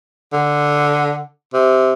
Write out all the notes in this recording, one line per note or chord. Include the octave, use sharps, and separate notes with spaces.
D3
C3